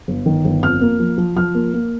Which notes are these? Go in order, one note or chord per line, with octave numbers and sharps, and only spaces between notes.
G1
D#3
G1
F2 F6
A#3
F3
F3
F3 F6
A#3
A#3